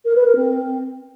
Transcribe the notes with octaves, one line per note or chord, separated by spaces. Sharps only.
A#4
B4
A#4
C4